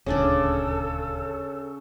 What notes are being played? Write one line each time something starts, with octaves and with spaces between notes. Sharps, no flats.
D#1 D2 C#3 D4 A4 D5